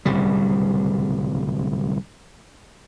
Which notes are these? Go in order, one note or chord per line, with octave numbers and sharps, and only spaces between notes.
D1 C2 C#3 G3